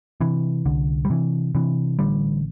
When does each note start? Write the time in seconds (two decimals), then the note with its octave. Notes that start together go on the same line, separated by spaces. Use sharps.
0.21 C3 E3
0.65 C2 D3
1.05 G3
1.10 C3 E3
1.55 C3 E3
1.99 A1 D3 G3